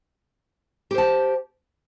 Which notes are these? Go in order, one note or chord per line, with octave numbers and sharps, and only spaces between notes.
G4 C5 A5